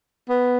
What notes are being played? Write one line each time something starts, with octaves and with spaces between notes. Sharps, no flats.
B3